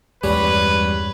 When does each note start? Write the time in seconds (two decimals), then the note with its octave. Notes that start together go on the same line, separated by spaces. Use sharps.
0.24 E2 G2 G3 G#3 C#4 B4